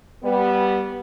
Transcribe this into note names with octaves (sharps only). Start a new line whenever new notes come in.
G3 B3